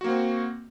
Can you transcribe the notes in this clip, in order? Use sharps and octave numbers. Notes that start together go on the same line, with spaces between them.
A#3 C4 F#4